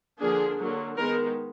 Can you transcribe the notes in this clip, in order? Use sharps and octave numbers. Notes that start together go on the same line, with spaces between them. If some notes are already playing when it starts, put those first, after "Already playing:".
D3 F3 A#3 D4 G#4
D3 F#3 A#3
D#3 G#3 B3 D#4 A#4